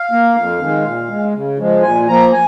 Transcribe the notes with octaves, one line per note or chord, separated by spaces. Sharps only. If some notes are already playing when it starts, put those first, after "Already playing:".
Already playing: F5
A#3
F2
D#3 G#3
A#2
G#3
C#3
F3 G#3
A#2 G#5
F3 A#3 A#5
G#5